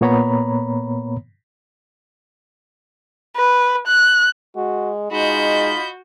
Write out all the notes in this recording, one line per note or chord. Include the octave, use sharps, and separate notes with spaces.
A#2 A#3 B3 C#5 A#5 B5
B4
F#6
G#3 F#4
G#3 D#4 F4 F#4 D#5 B5 G6